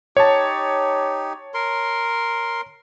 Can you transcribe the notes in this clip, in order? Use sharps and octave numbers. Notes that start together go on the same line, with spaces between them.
D#4 G4 C#5 A5
A#4 C6